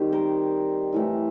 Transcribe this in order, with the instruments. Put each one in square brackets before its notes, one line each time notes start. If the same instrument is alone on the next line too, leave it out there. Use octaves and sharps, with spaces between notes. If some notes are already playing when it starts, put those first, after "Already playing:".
Already playing: [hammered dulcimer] D#3 G3 C4 D#4 G4
A#4 C5
A2 E3 A3